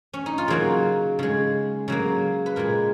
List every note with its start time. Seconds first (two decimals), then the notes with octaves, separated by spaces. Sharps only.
0.13 C#4
0.26 D#4
0.38 F4
0.48 C#3 F#3 A#3 F#4
1.19 C#3 G#3
1.88 C#3 F#3 A#3
2.46 B4
2.56 A#2 G#3 A#4